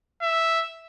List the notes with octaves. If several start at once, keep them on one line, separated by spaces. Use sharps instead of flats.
E5